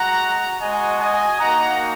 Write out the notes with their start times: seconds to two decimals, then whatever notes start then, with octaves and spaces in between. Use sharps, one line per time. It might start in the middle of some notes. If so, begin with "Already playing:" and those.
Already playing: G#3 F#4 F#5 A#5
0.60 G#3 F#4 D#5 G#5
1.00 D#5 G#5
1.40 A#3 D#4 F#4 F#5 A#5